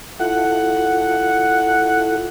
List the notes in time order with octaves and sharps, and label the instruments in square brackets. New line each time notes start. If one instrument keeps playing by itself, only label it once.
[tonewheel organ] E4 F4 A4 [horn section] F#5